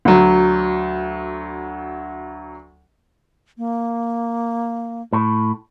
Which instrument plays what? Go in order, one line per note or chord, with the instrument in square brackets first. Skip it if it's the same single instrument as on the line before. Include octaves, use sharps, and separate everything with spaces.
[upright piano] D2 F#3
[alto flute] A#3
[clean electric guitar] A2